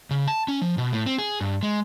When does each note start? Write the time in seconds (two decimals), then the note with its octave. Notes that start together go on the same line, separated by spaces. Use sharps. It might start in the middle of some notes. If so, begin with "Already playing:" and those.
0.11 C#3
0.28 A5
0.48 C#4
0.62 F3
0.78 B2
0.92 A2
1.06 C4
1.19 G#4
1.41 G2
1.63 G#3